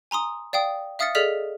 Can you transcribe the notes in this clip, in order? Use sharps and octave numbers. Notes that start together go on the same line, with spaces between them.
G#5 A#5 C6 D#6
D5 F5 G5 D#6
E5 F5 D#6 F6 A6 C#7
G#4 A4 D5 D#5 F6 B6